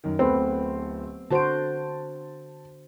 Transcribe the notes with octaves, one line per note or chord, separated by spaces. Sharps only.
F#2 D#3
D1 A3 B3 C4 B4 C6
D3 F#4 C5 A5 D7